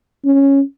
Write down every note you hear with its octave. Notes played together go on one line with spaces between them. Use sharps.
C#4